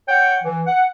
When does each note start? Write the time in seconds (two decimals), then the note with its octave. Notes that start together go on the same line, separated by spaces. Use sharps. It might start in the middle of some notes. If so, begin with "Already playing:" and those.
0.09 C#5 F#5 G5
0.44 E3
0.67 F#5